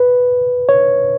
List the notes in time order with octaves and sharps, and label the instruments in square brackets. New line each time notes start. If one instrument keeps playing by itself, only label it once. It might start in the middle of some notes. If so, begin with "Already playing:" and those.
Already playing: [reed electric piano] B4
C#5